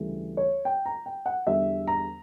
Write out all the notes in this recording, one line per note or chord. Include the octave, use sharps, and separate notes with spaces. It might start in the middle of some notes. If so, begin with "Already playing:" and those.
Already playing: D2 C#3 E3 G3
C#5
G5
A#5
G5
F#5
E2 D3 G3 E5
A#5